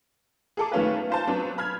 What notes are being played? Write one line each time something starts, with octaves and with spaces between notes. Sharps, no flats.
G#4 A4 D6
D#3 A3 B3 C#4 F4 B4
F4 C5 A5
F#3 B3 D4
B5 F6 G#6